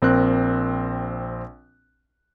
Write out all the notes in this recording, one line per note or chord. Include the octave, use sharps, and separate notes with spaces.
A#1 C4 A#4 F#6